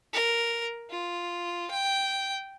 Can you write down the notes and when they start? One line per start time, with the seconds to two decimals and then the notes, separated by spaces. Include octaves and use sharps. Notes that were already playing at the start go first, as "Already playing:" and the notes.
0.13 A#4
0.90 F4
1.71 G5